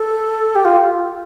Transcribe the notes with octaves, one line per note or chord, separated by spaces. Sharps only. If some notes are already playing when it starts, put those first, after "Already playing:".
Already playing: A4
G4
F4